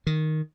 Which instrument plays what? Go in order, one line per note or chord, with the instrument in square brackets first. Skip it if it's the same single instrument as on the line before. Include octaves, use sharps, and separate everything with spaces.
[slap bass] D#3